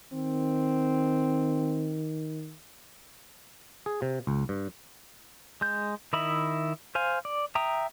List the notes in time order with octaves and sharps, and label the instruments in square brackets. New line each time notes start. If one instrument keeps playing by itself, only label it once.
[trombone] D#3 [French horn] C4
[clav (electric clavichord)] G#4
C3
C#2
G2
[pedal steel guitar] G#3 G6
D#3 E4 D#5 E5 B5
C5 F5 G#5
D5
E5 G5 A#5 D#6